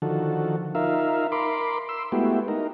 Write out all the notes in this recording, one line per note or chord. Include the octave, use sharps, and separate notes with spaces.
D3 D#3 F3 F#4 A4
D#4 F4 A#4 E5 F5
A#4 B5 C6 D6
C6 E6
G#3 A3 B3 E4 F#4 G4
D#4 A#4